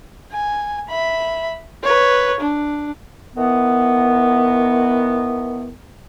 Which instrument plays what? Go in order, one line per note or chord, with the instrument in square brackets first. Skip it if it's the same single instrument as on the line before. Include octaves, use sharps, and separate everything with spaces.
[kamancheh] G#5
E5 B5
B4 C#5
D4
[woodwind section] D#3 E3 B3